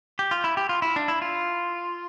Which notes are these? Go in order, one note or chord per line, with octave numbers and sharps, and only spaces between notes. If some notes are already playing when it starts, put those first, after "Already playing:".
G4
F4
E4
G4
F4
E4
D4
E4
F4